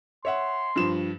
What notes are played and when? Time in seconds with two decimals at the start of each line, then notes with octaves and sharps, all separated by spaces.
0.25 C#5 E5 F#5 C6
0.76 G2 F3 E7